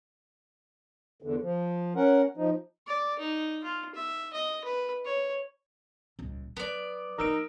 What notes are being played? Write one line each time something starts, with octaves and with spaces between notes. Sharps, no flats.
E2 D3
F3
C#4 A#4 F#5
F3 D#4
D5
D#4
F4
E5
D#5
B4
C#5
D#1 C#2
F#3 B3 D5
F3 A#3 D#4 A#4 E6 D7